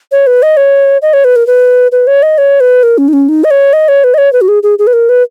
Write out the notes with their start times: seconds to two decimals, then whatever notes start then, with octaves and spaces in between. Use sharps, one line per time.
0.12 C#5
0.27 B4
0.42 D#5
0.57 C#5
1.02 D#5
1.13 C#5
1.24 B4
1.36 A#4
1.47 B4
1.92 B4
2.07 C#5
2.23 D#5
2.38 C#5
2.60 B4
2.83 A#4
2.98 C#4
3.08 D#4
3.13 C#4
3.29 D#4
3.44 D#5
3.51 C#5
3.73 D#5
3.88 C#5
4.04 B4
4.14 D#5
4.18 C#5
4.33 B4
4.41 F#4
4.48 G#4
4.63 G#4
4.79 G#4
4.87 B4
4.93 A#4
5.09 B4